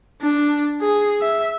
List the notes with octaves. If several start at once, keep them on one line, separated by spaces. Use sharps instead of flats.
D4
G#4
E5